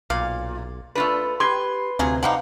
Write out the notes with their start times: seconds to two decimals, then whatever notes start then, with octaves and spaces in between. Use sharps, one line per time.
0.10 B1 A#2 F5
0.95 A3 D4 F4 B4
1.40 G4 B4 C6 G#6 G7
1.99 D2 C3 F#3 F4 G#4
2.23 F3 G3 D#4 F5 F#5